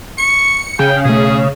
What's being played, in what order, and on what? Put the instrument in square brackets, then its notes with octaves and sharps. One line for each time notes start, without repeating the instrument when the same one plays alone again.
[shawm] C#6 [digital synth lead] C#7
[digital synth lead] C#3 [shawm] G5
[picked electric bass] B2 A3 [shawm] G#4